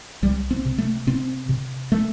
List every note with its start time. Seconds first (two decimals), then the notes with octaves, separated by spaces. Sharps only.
0.22 C2 G3
0.51 C4
0.65 C3
0.78 A3
1.07 C3 C4
1.49 C3
1.92 A3